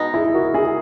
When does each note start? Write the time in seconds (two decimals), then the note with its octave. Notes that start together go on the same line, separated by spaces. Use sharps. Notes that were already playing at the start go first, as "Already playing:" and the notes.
Already playing: B2 G#3 D#4
0.14 E4 G#4
0.34 F#4 A#4
0.54 E4 G#4